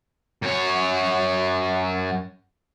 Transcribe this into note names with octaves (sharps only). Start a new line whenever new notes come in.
F#2 C#5